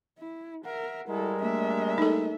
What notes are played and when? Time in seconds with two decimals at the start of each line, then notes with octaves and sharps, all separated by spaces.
0.19 E4
0.65 A#4 E5 F#5
1.09 G3 G#3 E4 A4 A#4
1.42 A3 A#3 D4 E5
1.98 D#4 A4